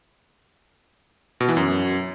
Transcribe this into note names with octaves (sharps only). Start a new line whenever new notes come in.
B2
E3
F#2